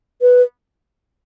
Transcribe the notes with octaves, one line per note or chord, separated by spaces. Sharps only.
B4